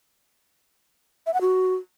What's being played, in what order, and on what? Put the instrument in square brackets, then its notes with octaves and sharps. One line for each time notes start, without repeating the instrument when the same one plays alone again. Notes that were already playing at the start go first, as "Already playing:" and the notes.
[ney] E5
F#5
F#4